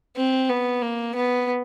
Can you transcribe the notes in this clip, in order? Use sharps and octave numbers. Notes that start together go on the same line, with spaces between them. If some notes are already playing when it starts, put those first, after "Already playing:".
C4
B3
A#3
B3